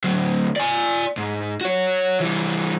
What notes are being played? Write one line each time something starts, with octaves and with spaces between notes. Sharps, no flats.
D2 F#3
D5 G#5
G#2
F#4 C#5
E3 G3